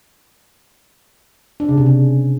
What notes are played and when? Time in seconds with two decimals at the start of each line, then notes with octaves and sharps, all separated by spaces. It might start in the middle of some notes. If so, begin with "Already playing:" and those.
1.60 D4
1.69 C#3
1.77 C3
1.86 C#4